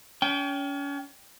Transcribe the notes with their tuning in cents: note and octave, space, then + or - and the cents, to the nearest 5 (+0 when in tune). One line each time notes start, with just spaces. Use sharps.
C#4 +35 G5 +0